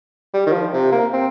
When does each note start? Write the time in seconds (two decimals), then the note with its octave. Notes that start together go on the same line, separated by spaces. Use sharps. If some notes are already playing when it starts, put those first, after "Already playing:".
0.34 G3
0.46 D#3
0.52 F3
0.73 C3
0.92 A#3
1.13 C4